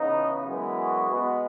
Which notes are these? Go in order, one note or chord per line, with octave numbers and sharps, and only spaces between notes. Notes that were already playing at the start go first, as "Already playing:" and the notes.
Already playing: C#3 E3 B3 D#4
F#2 E3 G#3 B3
F#4
B2 G#3 B3